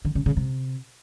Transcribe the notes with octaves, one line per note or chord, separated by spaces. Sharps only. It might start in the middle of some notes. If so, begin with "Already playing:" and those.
D3
C#3
C#3
C3